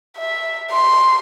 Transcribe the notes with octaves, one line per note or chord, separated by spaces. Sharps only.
E5
C6